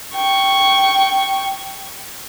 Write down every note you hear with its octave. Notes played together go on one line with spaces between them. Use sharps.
G5 C#6